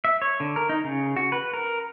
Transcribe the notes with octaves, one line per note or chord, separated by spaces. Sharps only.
E5
C#5
D3
A#4
D#4
C#3
F#4
B4
A#4